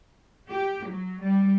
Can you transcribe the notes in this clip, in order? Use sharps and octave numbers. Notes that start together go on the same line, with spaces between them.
G4
F#3
G3